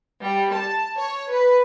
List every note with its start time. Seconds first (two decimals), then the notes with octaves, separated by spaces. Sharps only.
0.21 G3
0.53 A5
0.96 C#5
1.29 B4